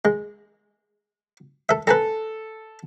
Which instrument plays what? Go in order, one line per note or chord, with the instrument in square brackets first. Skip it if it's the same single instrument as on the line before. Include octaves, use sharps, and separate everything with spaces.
[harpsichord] G#3
A4 E5
[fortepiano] A4 [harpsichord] B4 G#5 A#5